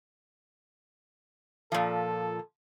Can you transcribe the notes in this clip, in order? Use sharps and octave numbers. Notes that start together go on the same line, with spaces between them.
A#2 F3 A4